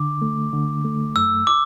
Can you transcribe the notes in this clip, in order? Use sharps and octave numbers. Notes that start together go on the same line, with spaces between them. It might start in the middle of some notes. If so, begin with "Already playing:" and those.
Already playing: D3 D6
A3
D3
A3
F#2 E6
D6